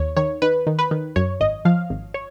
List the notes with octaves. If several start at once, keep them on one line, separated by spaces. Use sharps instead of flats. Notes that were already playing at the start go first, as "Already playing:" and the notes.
Already playing: D#2 C#5
D#3 C#5
D#3 B4
D#3
B4
D#3
F#2 C#5
G#1 D#5
F3 F5
G#1
C#5